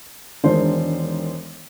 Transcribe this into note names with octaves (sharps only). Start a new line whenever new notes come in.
E1 D#3 G#3 D4 C5